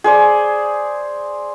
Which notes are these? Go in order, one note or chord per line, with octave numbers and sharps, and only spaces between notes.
G#4 C5 D5